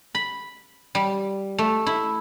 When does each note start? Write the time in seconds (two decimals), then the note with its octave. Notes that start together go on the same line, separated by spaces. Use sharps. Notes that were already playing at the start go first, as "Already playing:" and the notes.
0.15 B5
0.95 G3
1.58 A3
1.86 E4